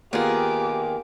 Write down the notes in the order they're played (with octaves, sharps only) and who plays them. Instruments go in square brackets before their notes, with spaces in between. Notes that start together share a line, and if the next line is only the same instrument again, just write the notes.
[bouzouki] D#3 G#4 [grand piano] A#3 B3 F4 [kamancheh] G4 D6